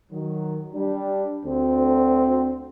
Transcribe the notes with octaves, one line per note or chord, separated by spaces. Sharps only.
D#3 F#3
G3 D4
D2 C4